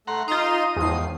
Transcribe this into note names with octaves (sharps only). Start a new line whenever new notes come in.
A3 F#5 A#5 C6
D#4 F4 A#5 C6 D#6
E2 G#2 D#3 F3 C7